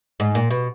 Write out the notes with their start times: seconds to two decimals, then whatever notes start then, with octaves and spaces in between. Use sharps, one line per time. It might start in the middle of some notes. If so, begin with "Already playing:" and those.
0.20 G#2
0.35 A#2
0.50 B2